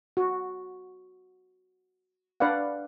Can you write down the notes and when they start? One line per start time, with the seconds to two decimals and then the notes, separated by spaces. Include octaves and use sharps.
0.17 F#4
2.40 D4 B4 D5 F5 F#5